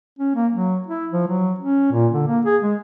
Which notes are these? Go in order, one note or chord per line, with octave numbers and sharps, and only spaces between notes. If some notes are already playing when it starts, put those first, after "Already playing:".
C#4
A#3
F#3
E4
F3
F#3
C#4
A#2
D3
A#3
G#4
G#3